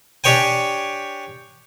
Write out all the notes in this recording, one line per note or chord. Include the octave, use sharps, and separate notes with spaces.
D4 G4 C#5 G5 G#5